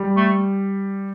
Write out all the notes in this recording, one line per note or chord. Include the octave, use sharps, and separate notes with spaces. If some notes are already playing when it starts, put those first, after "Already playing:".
Already playing: G3
A3